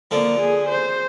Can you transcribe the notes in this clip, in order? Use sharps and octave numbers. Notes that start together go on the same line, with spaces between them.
D3 F3 A#3
G#4
C5